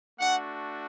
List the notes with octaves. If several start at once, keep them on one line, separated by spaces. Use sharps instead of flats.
A3 D4 F#4 F#5